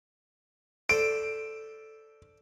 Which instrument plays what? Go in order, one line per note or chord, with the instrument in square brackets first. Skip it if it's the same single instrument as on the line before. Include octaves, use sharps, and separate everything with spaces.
[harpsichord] A4 C5 D5 [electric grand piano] D7